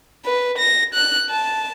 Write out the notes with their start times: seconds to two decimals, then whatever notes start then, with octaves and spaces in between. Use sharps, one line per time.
0.25 B4
0.58 A#6
0.94 F#6
1.30 A5